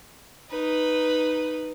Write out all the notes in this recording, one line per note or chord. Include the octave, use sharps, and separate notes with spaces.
D#4 B4